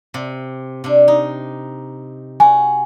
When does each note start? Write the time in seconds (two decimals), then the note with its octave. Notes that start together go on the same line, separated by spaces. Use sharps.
0.14 C3
0.84 C3 D4
1.08 D#4
2.40 F#4 G#5